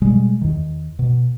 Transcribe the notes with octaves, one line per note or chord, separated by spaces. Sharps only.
B2 G3 G#3
E2 D#3
B2